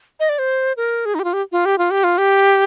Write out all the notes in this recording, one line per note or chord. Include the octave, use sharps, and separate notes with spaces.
D#5
D5
C5
A#4
G#4
D#4
G4
F4
G4
F4
G4
F4
G4
F4
G4